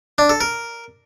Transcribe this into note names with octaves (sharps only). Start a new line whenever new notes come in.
D4
A4
A#4